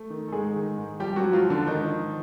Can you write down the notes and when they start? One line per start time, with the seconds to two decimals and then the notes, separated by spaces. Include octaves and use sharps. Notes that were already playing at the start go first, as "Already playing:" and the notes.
Already playing: A3
0.10 D#3
0.28 A4
0.32 G#2 G#3 G#4
0.55 D#3
0.78 G#2
1.00 F3 G3 G4
1.16 F#3 F#4
1.22 G#2
1.33 F3 F4
1.45 F3
1.50 D3 D4
1.67 G#2 D#3 D#4
1.89 F3